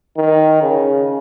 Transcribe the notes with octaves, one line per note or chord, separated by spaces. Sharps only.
D#3
C#3